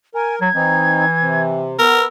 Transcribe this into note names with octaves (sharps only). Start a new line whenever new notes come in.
A#4 G#5
F#3 G#6
E3 C4 D#4
C3
B3 A#4 E6